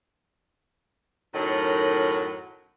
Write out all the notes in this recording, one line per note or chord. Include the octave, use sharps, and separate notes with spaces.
F#2 A2 D#3 F#3